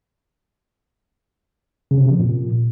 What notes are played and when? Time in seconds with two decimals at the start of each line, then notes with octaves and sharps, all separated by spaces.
1.91 C#3
2.01 C3
2.10 F3
2.20 A#2